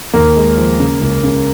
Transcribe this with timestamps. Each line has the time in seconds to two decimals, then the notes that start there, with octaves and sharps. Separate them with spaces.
0.13 D#2 A#3
0.37 G#3
0.57 F3
0.79 C#3
1.01 C#2
1.24 C#3